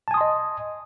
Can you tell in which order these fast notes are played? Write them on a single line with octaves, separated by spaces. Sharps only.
A5 G#5 D#6 C6 D#5